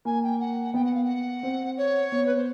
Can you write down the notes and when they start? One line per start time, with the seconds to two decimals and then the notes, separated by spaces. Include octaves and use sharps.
0.05 A#3 G#5
0.23 G5
0.40 F#5
0.74 B3 G5
0.84 F#5
0.94 F5
1.04 F#5
1.43 C4
1.77 C#5
2.12 B3
2.26 B4
2.36 C5